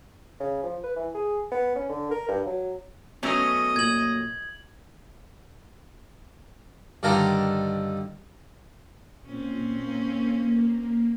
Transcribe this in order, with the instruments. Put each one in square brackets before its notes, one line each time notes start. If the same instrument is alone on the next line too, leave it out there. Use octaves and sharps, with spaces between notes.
[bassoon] C#3
F3
B4
E3
G#4
B3
C#4
D3
A#4
G2
F#3
[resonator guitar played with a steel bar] F#3 A3 C#4 [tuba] B3 [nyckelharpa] D#5
[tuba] A#2 [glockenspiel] G#6 F#7
[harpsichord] G2 D3 D#3 A4 F5 A#5
[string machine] A#2 [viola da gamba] C4 C#4
[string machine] A#3